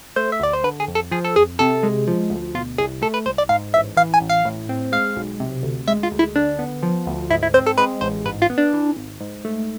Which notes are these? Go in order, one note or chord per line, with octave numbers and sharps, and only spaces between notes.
A3 C5
E5
D2 D5
C5
D3 B4
G#4
F2
A4
F3 G#4
A4
F2 G#4
C3 A4
G#3
F3
D2
B2 F4
C2 G#4
A3 A4
B4
C2 C5
D5
G#2 F5
A1 E5
E3 F5
G#5
A1
F5
A2
C4
G#3 F5
B1
C3
D2
G#3 E5
F4
D2
E4
D3 D4
B3
F3
D2
G#2 E4
E4
C4 C5
A4
G#3 B4
A1 C5
G#2 B4
F4
B3
D4
E3
G#1
G#2
A3